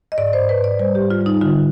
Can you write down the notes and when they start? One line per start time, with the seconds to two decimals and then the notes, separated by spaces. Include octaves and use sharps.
0.12 D#5
0.18 G#2 D5
0.33 C5
0.39 G#2
0.49 B4
0.59 G#2 D5
0.79 G3 C5
0.95 G4
1.00 G#2
1.10 F4
1.21 G3
1.26 D#4
1.41 D3 F4